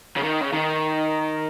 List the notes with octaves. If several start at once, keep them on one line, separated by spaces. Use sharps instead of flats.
C#3
D#3
C#3
D#3